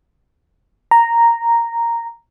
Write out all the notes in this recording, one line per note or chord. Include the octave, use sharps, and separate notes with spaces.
A#5